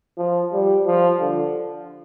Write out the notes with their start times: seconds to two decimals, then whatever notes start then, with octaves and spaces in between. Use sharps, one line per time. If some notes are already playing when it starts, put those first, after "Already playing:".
0.18 F3
0.53 G3
0.86 F3
1.20 D3